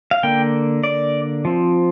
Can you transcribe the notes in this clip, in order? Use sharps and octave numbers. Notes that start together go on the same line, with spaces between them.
F5
D3 A#3 G5
D5
F3 C4